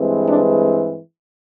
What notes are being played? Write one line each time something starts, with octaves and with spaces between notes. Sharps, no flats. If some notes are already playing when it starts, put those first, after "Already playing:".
Already playing: G2 E3 G#3 C4
D4